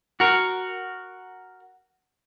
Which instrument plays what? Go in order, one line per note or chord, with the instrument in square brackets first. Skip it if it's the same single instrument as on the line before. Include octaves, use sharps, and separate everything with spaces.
[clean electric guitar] F#4 A#4